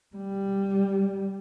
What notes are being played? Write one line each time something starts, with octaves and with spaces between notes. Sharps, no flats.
G3